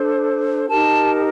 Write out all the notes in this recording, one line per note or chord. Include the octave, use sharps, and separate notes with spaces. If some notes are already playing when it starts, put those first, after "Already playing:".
Already playing: D4 A4 C5
D#4 G4 A#4 A5